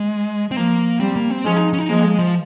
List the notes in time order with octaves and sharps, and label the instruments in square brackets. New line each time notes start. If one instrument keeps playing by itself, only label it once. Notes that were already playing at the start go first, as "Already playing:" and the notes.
Already playing: [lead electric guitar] G#3
C4
[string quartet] F3 [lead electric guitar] A#3
[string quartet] G3 [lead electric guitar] C4
[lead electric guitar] A#3
C4
[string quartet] F3 G#3 [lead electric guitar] C#4
[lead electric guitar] D#4
C#4
D#4
[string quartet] F3 G#3 [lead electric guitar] A#3
[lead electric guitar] G#3
F3